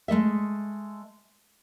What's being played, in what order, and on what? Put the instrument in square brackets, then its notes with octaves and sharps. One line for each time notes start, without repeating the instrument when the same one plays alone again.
[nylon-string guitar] G#3 A3 D#5 E5